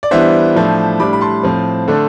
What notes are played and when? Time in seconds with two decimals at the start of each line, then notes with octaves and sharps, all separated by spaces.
0.03 D5
0.11 E3 G3 B3 D4 C5 E5
0.56 A2 F3 A3 D4
1.00 A2 G3 D4 B5 D6
1.13 B5
1.21 A5 C6
1.43 A2 F3 C4
1.88 D3 A3 D4